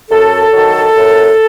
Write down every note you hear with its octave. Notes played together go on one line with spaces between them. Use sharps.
F#2 A4
D#3 F#3
F#2